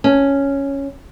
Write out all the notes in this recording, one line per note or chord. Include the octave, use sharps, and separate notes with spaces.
C#4